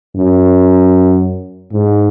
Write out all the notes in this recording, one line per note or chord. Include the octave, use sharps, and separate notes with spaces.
F#2
G#2